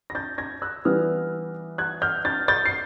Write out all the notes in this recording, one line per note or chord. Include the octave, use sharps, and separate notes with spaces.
A#6
G6 A6
G#6 A#6
E6 F#6
E3 G3 B3 D#6 F6
F#6 G#6
F6 G6
G6 A6
G6 A6
C7